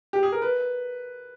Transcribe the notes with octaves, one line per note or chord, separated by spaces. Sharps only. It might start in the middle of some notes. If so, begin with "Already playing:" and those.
G4
G#4
A#4
B4